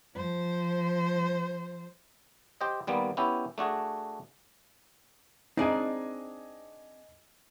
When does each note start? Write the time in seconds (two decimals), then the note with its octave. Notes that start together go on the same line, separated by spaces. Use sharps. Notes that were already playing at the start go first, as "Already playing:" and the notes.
0.15 F3 C5
2.61 G4 C5 D#5
2.87 D#2 G3 A#3 B3
3.17 B3 C#4 E4 G4
3.58 A3 D4 F#4 G#4
5.57 C4 D4 D#4 G#4 D#5 G#5